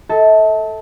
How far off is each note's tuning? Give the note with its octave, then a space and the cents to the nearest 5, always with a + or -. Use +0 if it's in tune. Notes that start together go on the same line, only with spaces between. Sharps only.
A4 +0 E5 -40